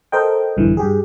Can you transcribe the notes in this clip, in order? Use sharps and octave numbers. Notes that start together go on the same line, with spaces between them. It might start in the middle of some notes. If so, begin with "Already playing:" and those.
A4 A#4 C5 D#5 G5
A#1 E2 G2 D3 E3
G2 G4 G#4